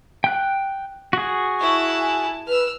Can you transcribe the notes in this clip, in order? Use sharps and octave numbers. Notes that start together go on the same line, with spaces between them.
G5 F#6
F#4 G#4
E4 A5 C#6
G#5
B4 E6 F6